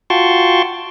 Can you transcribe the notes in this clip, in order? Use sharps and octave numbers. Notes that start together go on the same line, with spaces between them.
F4 F#4 G5 A5 C6 C#6